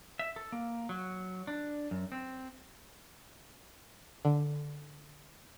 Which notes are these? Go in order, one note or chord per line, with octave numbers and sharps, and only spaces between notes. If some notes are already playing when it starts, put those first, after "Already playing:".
E5
A4
A#3
F#3
D4
F#2
C4
D3